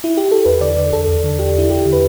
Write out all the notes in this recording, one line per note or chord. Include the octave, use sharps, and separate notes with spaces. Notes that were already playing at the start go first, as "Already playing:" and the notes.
E4
G4
A4
E2 B4
D3 D5
D3
E2 A4
E2
D3
D3 G4
E2 E4
E2 G4
D3
B4